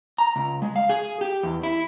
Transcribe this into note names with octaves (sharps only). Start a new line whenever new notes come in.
A#5
C#2
G#3
F5
G#4
G4
E2
E4